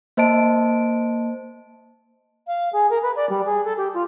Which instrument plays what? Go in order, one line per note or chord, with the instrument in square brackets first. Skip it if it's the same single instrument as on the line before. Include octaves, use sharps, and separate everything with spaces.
[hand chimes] A#3 C5 D#5 A5 D7
[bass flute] F5
G#4
A#4
B4
D5
G3
G#4
A4
G4
F4